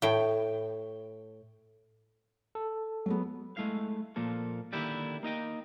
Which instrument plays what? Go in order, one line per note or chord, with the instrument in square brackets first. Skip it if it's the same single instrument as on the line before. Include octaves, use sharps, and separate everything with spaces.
[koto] A2 G5
[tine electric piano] A4
[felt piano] F#3 G#3 B3
[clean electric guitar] G#3 A3 E4 F5
A#2 F3 A#3 A4
D3 D#3 A#3 E4 G4 D5
A#3 D#4 D#5 G5